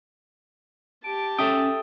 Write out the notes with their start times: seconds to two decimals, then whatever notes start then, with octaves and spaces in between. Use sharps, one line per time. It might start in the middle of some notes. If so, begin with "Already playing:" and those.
1.04 G4 A5 D7
1.39 C#4 A4 E5 G5 D#6